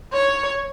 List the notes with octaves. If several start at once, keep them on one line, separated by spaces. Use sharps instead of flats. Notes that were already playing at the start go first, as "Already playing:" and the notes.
C#5